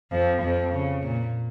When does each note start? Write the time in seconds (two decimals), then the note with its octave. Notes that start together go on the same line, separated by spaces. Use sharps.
0.12 F2 F3
0.42 F2 F3
0.73 C#3
1.03 A#2